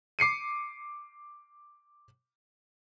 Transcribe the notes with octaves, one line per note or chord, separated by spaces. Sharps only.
D6 C7 C#7 D#7